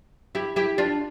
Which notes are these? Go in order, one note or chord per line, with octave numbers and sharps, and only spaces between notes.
E4 G4
E4 G4
D4 F4